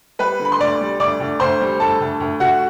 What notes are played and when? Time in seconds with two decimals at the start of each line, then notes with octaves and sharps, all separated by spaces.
0.19 G3 B4 B5
0.39 D3
0.45 B5
0.52 C6
0.60 D2 D5 D6
0.81 G3
1.00 D2 D5 D6
1.20 D2
1.40 D2 C5 C6
1.61 G3
1.80 D2 A4 A5
2.00 D2
2.20 D2
2.40 D2 F#4 F#5